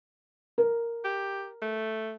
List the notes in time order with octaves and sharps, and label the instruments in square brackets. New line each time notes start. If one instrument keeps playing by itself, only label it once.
[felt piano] A#4
[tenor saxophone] G4
A3